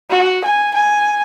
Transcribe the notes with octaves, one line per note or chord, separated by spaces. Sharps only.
F#4
G#5
G#5